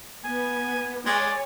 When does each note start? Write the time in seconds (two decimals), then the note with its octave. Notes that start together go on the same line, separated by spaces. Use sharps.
0.24 B3 G#5
1.06 G#3 C#5 D5 G#5